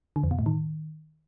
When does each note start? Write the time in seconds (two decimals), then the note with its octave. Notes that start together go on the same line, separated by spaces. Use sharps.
0.16 D3
0.24 F2
0.31 B2
0.39 A2
0.46 D#3